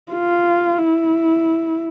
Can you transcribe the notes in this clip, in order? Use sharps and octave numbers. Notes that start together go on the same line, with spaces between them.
F4
E4